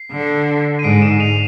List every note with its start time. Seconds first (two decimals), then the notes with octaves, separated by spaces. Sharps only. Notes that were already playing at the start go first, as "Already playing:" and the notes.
Already playing: C7
0.11 D3
0.79 D#7
0.84 G#2 C7 D7
1.01 D7 E7
1.20 D#7 F7